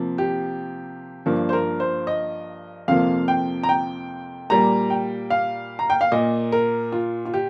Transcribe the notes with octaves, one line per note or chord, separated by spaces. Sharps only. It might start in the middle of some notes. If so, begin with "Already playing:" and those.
Already playing: C3 F3 A#3
G4
G2 F3 A#3
C5
A#4
C5
D#5
F2 C3 F3 A#3 F5
G5
A#5
G5
A#2 G3 A#3 A#5
G5
F5
A#5
G5
F5
A#2 A#3 D#5
A#4
F4
F4
G4